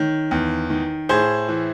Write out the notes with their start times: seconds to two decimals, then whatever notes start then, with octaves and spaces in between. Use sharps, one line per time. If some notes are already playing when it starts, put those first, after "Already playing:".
Already playing: D#3 C#5
0.31 E2
0.70 D#3
1.09 A2 G#4 C5
1.49 E3